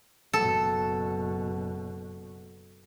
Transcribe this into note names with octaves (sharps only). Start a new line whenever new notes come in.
F#1 B2 A4